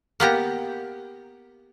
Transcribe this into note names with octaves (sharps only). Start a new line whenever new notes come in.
A#3 B3 G4 A#5